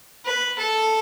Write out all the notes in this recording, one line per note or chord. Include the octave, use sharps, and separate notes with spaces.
B4
A4